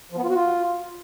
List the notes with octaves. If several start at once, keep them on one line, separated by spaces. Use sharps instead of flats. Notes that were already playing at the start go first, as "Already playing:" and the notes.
F3
B3
F4
F#4
F4